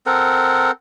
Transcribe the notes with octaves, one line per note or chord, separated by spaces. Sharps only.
C4 A4 A#4 F#5